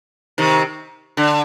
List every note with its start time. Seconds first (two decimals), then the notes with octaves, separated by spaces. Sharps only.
0.38 C3 D#3
1.17 D3